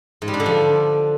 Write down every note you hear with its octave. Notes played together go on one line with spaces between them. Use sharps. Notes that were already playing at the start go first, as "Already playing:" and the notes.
G#2
G3
D4
D3
F3